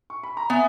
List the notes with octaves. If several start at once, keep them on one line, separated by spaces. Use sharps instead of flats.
C#6
B5
A#5
B3 E5 G#5